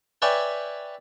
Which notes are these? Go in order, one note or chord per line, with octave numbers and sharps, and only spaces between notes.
B4 C#5 D5 E5 G5 G#5